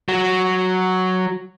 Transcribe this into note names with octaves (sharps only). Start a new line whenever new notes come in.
F#3